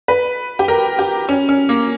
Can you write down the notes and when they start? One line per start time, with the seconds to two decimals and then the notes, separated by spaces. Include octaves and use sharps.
0.08 B4
0.59 G4
0.68 A#4
0.99 G4
1.29 C#4
1.49 C#4
1.69 A#3